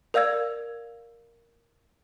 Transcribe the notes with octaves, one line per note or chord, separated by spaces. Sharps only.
A#4 D5 F5 E6 G#6